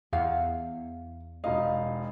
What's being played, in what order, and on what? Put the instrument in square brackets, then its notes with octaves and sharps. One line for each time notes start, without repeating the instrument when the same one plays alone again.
[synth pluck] E2 [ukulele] E4 F5 F#5
[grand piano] E1 D#4 F5 [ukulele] D#5